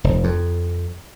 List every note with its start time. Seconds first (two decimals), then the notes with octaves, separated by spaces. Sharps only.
0.04 F1
0.24 F2